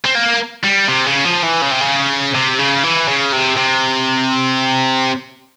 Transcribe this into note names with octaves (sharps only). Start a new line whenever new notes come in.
C4
A#3
G3
C3
C#3
F3
E3
C#3
C3
C#3
C3
C#3
E3
C#3
C3
C3